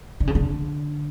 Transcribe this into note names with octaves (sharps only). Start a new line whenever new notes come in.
D3
C#3
D3